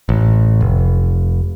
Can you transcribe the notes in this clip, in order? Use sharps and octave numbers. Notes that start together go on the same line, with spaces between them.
A1
F1